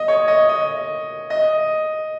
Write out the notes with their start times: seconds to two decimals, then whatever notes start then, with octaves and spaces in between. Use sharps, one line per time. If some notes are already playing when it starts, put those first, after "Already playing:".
Already playing: D#5
0.08 C#5
0.28 D#5
0.49 D#5
1.30 D#5